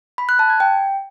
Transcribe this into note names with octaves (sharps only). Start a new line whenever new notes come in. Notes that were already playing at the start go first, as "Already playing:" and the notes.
B5
F#6
A5
G#6
G5